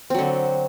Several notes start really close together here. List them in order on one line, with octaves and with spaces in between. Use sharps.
C4 F#3 D3